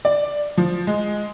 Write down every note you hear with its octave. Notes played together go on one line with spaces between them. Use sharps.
D5
F3
G#3